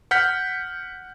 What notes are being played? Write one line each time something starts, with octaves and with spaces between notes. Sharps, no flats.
F#5 F6 G6 B6